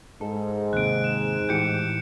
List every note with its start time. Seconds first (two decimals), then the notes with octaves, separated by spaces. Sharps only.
0.21 G#2 A4
0.73 D#2 C3 F#6 D7
1.04 E7
1.49 A2 E3 G4 G6 C#7